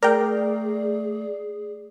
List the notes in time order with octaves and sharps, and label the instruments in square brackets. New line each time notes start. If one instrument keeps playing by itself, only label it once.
[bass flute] A3 [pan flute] G#4 [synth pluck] A#4 G5 [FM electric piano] D5